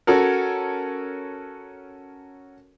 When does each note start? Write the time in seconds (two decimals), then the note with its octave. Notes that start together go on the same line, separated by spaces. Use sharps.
0.07 C#4 F#4 A4 A#4